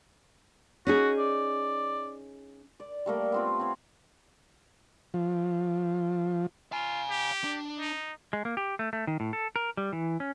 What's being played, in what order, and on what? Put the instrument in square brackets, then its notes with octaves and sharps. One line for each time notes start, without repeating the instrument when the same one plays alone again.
[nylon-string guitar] C#4 D#4 G#4 [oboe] F#4
[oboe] D5
[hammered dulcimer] D5
G3 A3 A#3
B3 C4 F4
C4 C#5
[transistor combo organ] F3
[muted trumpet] F4 [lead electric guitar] F5 G#5
[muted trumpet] G4
[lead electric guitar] D4
[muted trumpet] D#4
[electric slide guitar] G#3
A#3
G4
A3
A3
D#3
A2
A4
A#4
G3
E3
C#4